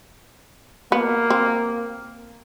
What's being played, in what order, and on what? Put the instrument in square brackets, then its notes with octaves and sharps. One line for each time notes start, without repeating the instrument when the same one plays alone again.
[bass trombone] A#3 [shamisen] B3
[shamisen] C4